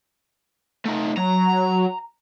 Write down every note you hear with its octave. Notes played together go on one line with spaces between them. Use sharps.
A3 D#4
F#3 A#5